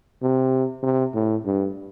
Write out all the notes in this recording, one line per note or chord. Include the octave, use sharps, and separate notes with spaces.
C3
C3
A2
G2